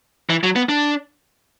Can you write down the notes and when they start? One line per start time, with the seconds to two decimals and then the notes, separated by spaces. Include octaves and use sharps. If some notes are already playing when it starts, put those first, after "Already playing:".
0.30 E3
0.43 F#3
0.56 B3
0.69 D4